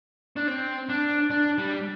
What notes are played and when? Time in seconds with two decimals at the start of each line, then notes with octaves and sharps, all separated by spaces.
0.37 D4
0.48 C4
0.89 D4
1.30 D4
1.58 G3